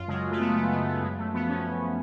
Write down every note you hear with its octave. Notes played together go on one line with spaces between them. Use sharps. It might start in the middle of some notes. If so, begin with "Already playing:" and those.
Already playing: F#2 F4
C#3 F#3 G#3
A3
F#2 B3
A3
C#3 F#3 A3
B3
F#2 G#3
A3
F3 B3
C#4
F#2